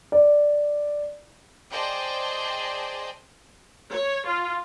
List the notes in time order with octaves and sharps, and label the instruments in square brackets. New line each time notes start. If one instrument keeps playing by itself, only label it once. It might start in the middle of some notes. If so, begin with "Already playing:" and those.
[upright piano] D5
[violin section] G#4 C5 D5 D#5 G5 A5
[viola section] C#5
F4